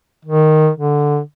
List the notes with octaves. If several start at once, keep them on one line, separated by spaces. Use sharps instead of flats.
D#3
D3